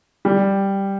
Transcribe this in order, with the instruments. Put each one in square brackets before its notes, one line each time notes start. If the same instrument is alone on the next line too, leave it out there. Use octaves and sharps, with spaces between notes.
[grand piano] G3